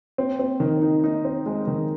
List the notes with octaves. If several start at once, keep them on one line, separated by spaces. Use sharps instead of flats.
C4
C4
D#3
D#4
D#4
C4
G#3
D#3